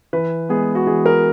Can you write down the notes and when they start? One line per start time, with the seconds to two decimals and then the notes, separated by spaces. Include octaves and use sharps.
0.13 E3 B4
0.49 G#3 B3 G#4
0.75 F#4
0.87 E3 G#4
1.06 A#4